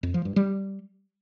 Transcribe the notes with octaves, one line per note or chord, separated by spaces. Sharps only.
F2
F3
G2
G3